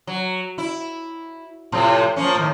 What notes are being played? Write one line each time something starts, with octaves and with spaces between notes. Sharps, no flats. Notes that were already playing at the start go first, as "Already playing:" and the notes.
F#3
E4
A2 C3 F3
F3 A#3 C#4
A2 D#3